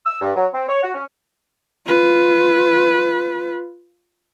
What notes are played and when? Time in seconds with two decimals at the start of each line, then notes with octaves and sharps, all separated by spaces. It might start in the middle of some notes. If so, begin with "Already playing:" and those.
0.06 E6
0.21 G2
0.36 F#3
0.53 C4
0.69 C#5
0.82 F#4
0.94 C#4
1.86 F4 B4